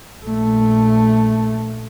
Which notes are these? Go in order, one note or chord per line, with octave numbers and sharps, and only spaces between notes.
A#1 A3